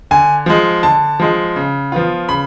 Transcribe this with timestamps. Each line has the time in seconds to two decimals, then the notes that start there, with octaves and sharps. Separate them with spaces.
0.11 D3 G#5
0.46 F3 G#3
0.83 D3 A5
1.20 F3 G#3
1.56 C#3
1.92 F3 B3 F4
2.29 C#3 B5